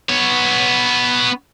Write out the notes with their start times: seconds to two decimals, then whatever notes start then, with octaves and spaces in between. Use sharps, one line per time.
0.09 B3 C#5